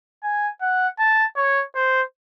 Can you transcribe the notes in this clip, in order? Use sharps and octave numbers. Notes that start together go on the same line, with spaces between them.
G#5
F#5
A5
C#5
C5